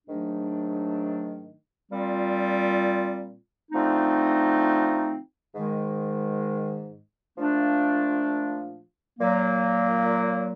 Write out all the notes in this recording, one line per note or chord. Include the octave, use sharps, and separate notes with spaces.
G#2 D#3 F#3 A3 D4
A#2 G3 C4 F4
D3 F3 A3 C4 D#4
G#2 D#3 G#3
A#2 F3 A3 D4 F4
A#2 F#3 A#3